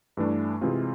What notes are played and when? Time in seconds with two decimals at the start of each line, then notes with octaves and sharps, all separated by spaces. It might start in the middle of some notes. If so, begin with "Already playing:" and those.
0.17 G2 E3 A3 D4
0.61 C3 E3 G#3 C4 F4